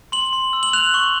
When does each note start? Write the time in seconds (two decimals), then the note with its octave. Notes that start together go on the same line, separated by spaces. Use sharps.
0.12 C6 F#7
0.33 C6
0.53 E6
0.63 F#7
0.73 F#6 F7
0.94 C#6